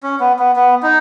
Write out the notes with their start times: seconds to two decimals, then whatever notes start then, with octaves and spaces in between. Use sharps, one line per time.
0.03 C#4
0.20 B3
0.39 B3
0.56 B3
0.83 D#4